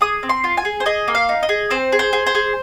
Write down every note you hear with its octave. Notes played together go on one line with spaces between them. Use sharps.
G#4 D#6
C4
C6
F4
G#5
G#4
C5
G#4 D#5
A#3
F5
D#4
D#5
G#4
C4 C5
G#4
C5
G#4
C5
G#4